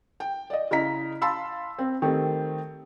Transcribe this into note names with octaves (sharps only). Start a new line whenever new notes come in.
G5
D5 D#5
C#3 E4 D#5 A#5 B6
F5 A5 B5 C6 E6
C4
D#3 A3 C4 G4